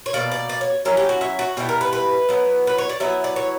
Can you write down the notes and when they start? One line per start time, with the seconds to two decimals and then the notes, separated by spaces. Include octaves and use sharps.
0.06 C#5
0.13 B2 G3 A#3 D5
0.32 D5
0.49 D5
0.61 C#5
0.85 F#3 C#4 E4 A#4
0.97 G4
1.09 F#4
1.21 E4
1.39 F#4
1.57 B2 G3 C#4 E4 G4
1.69 A#4
1.81 B4
1.93 B4
2.29 F#3 B3 E4
2.67 B4
2.78 C#5
2.89 D5
3.00 F#3 B3 E4 E5
3.24 D5
3.36 C#5